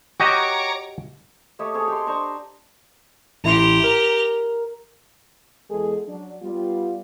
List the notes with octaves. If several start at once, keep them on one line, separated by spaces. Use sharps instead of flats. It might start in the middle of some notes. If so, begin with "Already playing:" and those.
F#4 G4 C#5 D#5 A#5 D6
A3 G4 C#5 D#5
C4 G#4 A4 C#5
G4 C6
D4 C5 A#5 C#6
A1 E4 G4 A#5 C6
A#4
E2 G#3 B3 G#4 A4
F#3 D4
G3 B3 F4